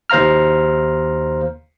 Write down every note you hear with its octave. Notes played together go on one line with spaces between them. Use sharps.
D#2 C5 F5 A#5 F6